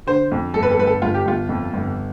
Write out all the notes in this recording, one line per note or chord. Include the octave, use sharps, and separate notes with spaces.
D3 C5
F2
G1 A4
B4
A4
G1 B4
A4
G1 F4
G4
G1 F4
F2
G1